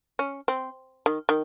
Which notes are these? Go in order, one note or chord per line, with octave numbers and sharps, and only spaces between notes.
C#4
C4
D#3
D#3